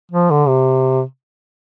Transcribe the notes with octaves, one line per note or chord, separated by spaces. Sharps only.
F3
D3
C3